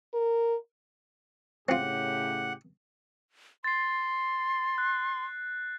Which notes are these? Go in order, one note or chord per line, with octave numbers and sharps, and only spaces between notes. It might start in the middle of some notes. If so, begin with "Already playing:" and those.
A#4
A2 C#3 C4 F4 G4 F#5
C6 A6 C7
F#6